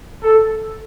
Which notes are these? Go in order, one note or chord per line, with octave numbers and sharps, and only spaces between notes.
A4